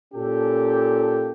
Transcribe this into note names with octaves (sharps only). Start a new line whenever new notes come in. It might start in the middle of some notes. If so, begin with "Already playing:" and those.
A#2 C#4 G4 A4